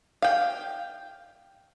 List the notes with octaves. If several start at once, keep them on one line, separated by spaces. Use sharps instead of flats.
F5 G5